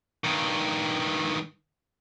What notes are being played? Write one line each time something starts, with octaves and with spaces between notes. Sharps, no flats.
G2 D#3